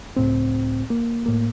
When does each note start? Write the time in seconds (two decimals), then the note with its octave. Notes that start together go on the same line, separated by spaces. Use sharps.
0.17 C#2 A2 C4
0.90 A#3
1.26 A2 A#3